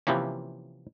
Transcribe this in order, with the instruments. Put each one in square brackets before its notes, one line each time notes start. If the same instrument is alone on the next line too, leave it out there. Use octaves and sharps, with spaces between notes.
[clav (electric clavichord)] C3 E3 F3 A#3 C#4